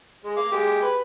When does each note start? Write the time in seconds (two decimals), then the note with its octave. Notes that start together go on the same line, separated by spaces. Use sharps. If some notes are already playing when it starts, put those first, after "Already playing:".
0.25 G#3
0.37 F5 D6
0.52 G#3 G4
0.82 B4